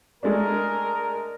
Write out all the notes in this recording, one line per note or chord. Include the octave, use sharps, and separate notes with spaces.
G#3 A3 D4 A#4